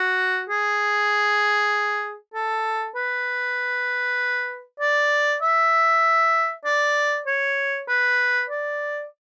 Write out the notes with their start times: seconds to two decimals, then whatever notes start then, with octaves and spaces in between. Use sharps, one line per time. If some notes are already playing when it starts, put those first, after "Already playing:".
Already playing: F#4
0.49 G#4
2.34 A4
2.96 B4
4.80 D5
5.42 E5
6.65 D5
7.27 C#5
7.88 B4
8.50 D5